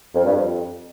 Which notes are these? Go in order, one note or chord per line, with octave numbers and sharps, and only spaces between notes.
F2
G2
F2